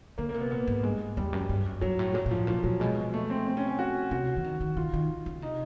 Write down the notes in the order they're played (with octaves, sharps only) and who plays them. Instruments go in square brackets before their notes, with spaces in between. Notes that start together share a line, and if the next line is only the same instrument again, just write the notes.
[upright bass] D3 [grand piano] A#3
[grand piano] A#3
[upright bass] C3
[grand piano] B3
[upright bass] A#2 [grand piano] B3
[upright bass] G#2
[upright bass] G2 [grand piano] G#3
[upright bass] E2 [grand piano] G3
[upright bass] F#2
G2
F#2
[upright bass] G2 [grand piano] F#3
[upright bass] A2
[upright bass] A#2 [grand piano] F#3
[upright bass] A#2
[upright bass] A2 [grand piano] F3
[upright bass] A#2 [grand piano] F3
[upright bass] A#2 [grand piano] F#3
[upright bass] B2 [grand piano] G#3
[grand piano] A3
C4
C4
C#4
C#4
F#4
[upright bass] C3 [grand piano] F#4
[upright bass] E3
D#3
D#3
[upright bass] D#3 [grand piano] F4
[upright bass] D#3
C#3
[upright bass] C3 [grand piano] D#4